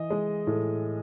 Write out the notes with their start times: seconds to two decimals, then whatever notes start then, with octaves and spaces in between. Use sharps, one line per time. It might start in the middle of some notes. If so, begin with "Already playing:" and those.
Already playing: E3 D#5
0.10 G#3
0.47 A2